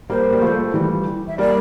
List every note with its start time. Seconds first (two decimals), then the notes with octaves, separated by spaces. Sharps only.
0.10 G3 A#3 C5
0.32 G3
0.41 F3 A3
0.74 E3 G3
1.27 E5
1.38 G3 A#3 D5